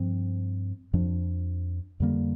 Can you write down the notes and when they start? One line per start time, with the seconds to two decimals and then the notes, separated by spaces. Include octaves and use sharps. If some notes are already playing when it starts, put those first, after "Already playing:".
Already playing: G2 F3 C4
0.93 F2 F3 D4
2.00 F2 D3 G3 A#3